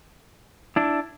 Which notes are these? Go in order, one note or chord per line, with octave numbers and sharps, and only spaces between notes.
D4 E4